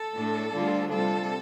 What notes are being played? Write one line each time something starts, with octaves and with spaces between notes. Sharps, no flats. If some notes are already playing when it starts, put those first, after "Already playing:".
Already playing: A4
A2 A3 D4
D2 D3 G3 D4 F4
C3 G3 F4 A4